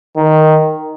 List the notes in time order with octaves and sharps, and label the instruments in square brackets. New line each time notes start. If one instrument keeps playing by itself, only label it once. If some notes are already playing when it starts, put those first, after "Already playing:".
[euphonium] D#3